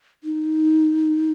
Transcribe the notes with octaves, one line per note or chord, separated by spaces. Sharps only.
D#4